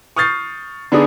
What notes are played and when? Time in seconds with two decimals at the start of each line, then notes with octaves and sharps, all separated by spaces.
0.16 C#6 D#6 F6 G6 A6 C7
0.92 D3 B3 D4 D#4 G#4 D#6